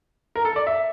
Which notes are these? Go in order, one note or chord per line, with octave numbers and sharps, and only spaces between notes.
A#4
A4
D5
E5